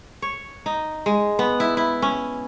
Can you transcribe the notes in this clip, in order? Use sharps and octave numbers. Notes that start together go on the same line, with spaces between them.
C#5
D#4
G#3
B3
E4
E4
C#4